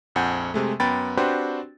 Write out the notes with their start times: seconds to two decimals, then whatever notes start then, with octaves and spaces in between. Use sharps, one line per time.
0.15 A#1 F2 F#5 G#5 G6
0.54 C3 G#3 A3
0.80 F#2 B3 G5 B5 A6
1.17 C4 D4 F#4 G4 B4 C5